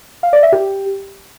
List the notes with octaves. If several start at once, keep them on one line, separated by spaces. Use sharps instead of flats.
F5
D5
E5
G4